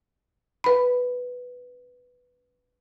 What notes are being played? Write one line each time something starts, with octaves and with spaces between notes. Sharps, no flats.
B4 B5